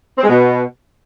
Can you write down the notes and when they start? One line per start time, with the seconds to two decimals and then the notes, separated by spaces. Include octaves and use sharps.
0.18 C4
0.23 G#3
0.29 B2